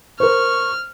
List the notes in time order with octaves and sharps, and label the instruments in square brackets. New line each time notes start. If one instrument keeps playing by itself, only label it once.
[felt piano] A#4 C5 [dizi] C#6 [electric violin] F6